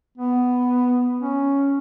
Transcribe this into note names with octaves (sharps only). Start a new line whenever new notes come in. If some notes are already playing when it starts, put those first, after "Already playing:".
B3
C#4